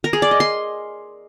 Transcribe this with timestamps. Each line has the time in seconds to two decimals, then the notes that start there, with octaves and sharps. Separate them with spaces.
0.04 A#4
0.13 G#4
0.22 D5
0.31 D#5
0.40 C6